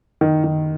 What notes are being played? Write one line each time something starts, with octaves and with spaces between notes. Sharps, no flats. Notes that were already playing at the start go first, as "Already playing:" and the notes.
D#3
D#3